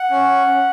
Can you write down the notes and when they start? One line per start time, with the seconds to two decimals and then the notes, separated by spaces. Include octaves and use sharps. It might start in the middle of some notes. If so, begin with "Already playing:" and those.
Already playing: F#5
0.11 C#4